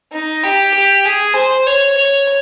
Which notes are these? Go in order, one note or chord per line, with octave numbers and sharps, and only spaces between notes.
D#4
G4
G4
G#4
C5
C#5
C#5